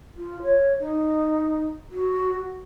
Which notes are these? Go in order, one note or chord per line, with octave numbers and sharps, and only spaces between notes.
F4
C#5
D#4
F#4